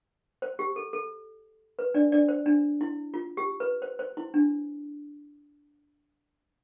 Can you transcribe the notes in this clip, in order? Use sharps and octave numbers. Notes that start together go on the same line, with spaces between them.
C5
G4
A4
A4
B4
D4 D5
D4 D5
C5
D4
E4
F4
G4
B4
C5
C5
E4
D4